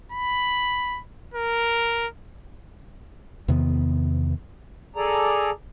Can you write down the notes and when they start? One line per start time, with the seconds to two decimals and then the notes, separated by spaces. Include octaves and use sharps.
0.12 B5
1.34 A#4
3.48 E2 C3 D#3 B3
4.96 G#4 A4 D5 A#5